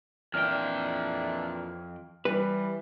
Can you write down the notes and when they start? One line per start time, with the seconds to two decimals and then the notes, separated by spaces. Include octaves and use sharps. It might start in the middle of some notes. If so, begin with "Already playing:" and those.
0.34 F2 A#2 E3 D4 G5 F6
2.25 E3 G3 B4